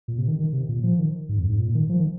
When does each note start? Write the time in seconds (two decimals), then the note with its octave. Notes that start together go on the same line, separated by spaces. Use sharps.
0.08 A#2
0.18 C3
0.28 D#3
0.39 D#3
0.53 C3
0.69 A#2
0.83 F3
0.98 D#3
1.29 G#2
1.39 F2
1.49 G#2
1.59 A#2
1.75 D#3
1.89 F3
2.00 D#3